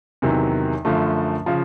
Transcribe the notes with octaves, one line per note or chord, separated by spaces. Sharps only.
E2 C3 D#3 F#3
F#2 D3 F3 A3
C#3 F3